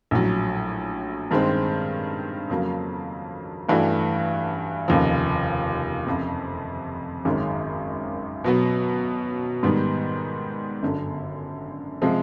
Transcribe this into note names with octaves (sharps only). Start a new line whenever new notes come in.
A#1 A2 F#3
G2 D#3 G#3 C4
F2 C#3 F#3 A#3
G2 E3 A3 D4 F#4
F1 D#2 C#3 F3
F#1 F2 C3
G#1 F#2 D#3 G#3 C#4
B2 F#3 B3
G#2 D#3 G3 B3
G1 F#2 D3
C3 F3 G#3